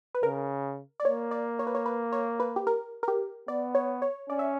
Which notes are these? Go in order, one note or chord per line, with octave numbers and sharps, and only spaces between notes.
B4
C#3 A#4
D5
A#3 C#5
D5
C#5
B4
C#5
B4
C#5
B4
G4
A#4
A#4
G4
B3 D5
C#5
C#5
C#4 D5
E5